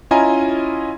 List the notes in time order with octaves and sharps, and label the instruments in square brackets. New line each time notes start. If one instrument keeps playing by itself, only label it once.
[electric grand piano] C#4 E4 F4 D#5 G#5 A#5